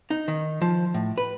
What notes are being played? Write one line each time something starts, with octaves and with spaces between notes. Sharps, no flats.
D#4
D#3
F3
A2
B4